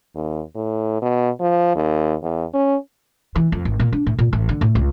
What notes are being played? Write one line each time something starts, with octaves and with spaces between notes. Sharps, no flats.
D#2
A2
B2
F3
D#2
E2
C#4
E3
F2
G#1
A#2
D4
A2
A#2
A1
D3
A2
C#2